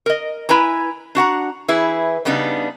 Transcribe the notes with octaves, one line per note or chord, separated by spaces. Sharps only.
A#4 D#5
E4 B4 G#5 A#5
D4 F#4 F#5 A#5
E3 E4 G#4 B4
C#3 G3 B3 D4 D#4